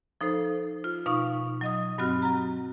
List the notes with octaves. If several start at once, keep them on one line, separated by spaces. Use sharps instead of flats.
F3 D#4 A4 C5
F4
B2 D#4 F5 C#6
F#3 D#5 D#6
G2 F#3 C4 F#4 F6 F#6
F#3 A#5